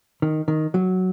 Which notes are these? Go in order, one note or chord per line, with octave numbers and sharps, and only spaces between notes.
D#3
D#3
F#3